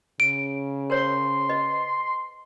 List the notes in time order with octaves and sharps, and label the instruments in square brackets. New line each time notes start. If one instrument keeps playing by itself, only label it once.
[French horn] C#3 [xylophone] D7
[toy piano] A#4 C5 C#5 [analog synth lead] C6
[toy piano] B4 D#5